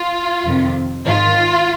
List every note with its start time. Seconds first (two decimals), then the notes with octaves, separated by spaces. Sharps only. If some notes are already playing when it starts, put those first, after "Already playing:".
Already playing: F4
0.45 F2 C3 D#3
1.06 G#2 D#3 F4